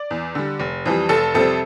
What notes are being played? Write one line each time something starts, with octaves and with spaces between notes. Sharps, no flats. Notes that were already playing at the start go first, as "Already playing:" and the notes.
Already playing: D5
E2
D3 G3
F1
F2 E3 G3
F1 A4
F2 C3 G3 C4 A4